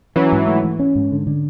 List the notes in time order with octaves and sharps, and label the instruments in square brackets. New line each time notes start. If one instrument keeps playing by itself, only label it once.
[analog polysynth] E3 F#3 [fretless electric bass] C#4
[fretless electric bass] G#2
A3
E3
C#4
G#2
D3
D3